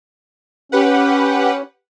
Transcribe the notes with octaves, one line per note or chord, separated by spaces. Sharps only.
C#4 G4 B4 F#5